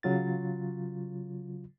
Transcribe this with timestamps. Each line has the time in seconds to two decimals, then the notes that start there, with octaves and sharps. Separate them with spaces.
0.03 C#3 F#3 F4 A6